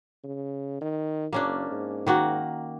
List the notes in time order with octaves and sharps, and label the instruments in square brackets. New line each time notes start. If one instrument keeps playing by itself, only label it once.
[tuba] C#3
D#3
[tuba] F#1 [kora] A#3 C#4 D4
[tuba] G#2
[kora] D#3 A#3 F#4